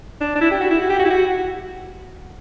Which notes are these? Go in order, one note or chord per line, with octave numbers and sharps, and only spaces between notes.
D4
D4
E4
G4
F#4
E4
F#4
G4
F#4
E4
F#4